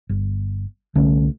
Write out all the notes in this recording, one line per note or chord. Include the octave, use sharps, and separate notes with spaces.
G1
C2 D3 A3 C#4